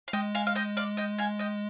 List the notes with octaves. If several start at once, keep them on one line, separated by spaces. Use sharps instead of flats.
F5
G#3 D#5 G5
F5 G#5
F5
D#5 G5
D5 F5
D#5 G5
F5 G#5
D#5 G5